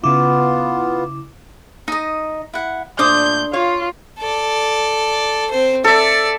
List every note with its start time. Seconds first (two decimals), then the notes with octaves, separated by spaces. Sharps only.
0.04 C#3 B3 E4 F4 D6
1.88 D#4 D#5
2.54 E4 F#5
2.99 A#2 A3 D4 C5 D6 D#6 G6
3.53 F4 C#5 F5
4.20 A4 D5
5.51 C4 C5
5.84 A4 D5 E5